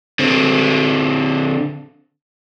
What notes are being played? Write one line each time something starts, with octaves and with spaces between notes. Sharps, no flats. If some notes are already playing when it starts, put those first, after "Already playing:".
D3 C4